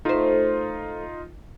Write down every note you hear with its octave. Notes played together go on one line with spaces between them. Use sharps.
A3 D#4 F4 C5